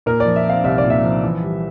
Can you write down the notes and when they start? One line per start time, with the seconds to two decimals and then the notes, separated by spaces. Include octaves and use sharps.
0.06 A#2 A#4
0.20 D5
0.26 F3
0.36 E5
0.46 C4 F5
0.64 C2 E5
0.78 D5
0.84 A#2
0.90 E5
1.03 F3
1.24 E3
1.42 G3